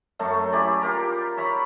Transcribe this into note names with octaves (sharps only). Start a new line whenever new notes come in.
F#2 F#3 A3
E4 G4 G#4 D5
F4 G4 A#4 A#5
C#5 E5 A#5 B5